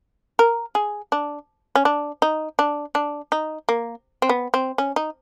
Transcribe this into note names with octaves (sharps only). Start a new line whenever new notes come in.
A#4
G#4
D4
C#4
D4
D#4
D4
D4
D#4
A#3
C4
B3
C4
C#4
D#4